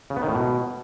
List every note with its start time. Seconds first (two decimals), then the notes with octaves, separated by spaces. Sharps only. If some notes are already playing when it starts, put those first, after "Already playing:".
0.10 C#3
0.16 B3
0.22 D#3
0.28 A2
0.35 B2